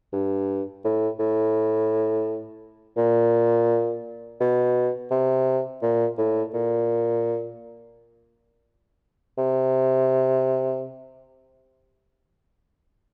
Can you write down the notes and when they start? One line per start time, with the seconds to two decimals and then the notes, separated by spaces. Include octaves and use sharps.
0.13 G2
0.84 A2
1.19 A2
2.97 A#2
4.40 B2
5.11 C3
5.82 A#2
6.18 A2
6.54 A#2
9.38 C3